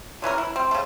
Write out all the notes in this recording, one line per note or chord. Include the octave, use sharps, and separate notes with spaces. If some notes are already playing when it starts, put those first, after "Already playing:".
D3 E3 C#4 A#4
E4
C4
C#3 A3